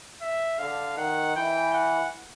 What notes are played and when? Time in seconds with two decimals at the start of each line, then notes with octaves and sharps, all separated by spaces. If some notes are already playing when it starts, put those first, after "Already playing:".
0.22 E5
0.59 D3 F5
0.97 D#3 F#5
1.36 E3 G5
1.74 F#5